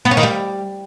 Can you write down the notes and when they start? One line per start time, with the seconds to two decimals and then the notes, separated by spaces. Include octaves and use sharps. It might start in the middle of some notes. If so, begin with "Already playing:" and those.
0.05 B3
0.11 C#4
0.17 D#3
0.23 G3